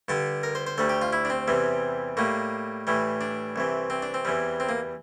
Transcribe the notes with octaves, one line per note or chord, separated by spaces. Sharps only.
G2 D3 G3 A5
A#4
C5
C5
D2 D3 G3 A4
G4
F4
E4
D4
C4
E2 C3 E3 G3
A2 G3 A#3
A2 E3 G3
D4
C2 C3 E3
C4
D4
C4
E2 E3 G3
C4
A#3